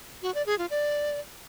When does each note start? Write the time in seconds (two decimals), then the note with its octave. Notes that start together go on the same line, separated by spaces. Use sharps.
0.22 F#4
0.34 D5
0.46 G#4
0.58 F4
0.70 D5